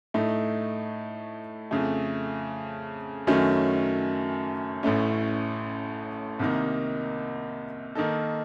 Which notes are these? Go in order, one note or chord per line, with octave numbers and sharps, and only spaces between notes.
A2 A3 D#4
F2 C#3 A3
F#2 D#3 F#3 A3 C#4
A1 A2 A3 C#4
C2 C3 D#3 A#3 D#4
D#3 A#3 D#4 A4